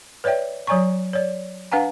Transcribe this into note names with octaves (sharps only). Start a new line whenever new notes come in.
B4 C#5 D5 E5 G5
F#3 C#5 D5 G#5 A#5 C#6
C#5 D5
D4 B4 F5 F#5 G#5 A#5